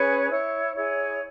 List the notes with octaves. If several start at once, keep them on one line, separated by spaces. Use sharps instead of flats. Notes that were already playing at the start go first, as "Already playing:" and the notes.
Already playing: C#4 G#4 B4 C#5
E4 C#5
E4 G#4 C#5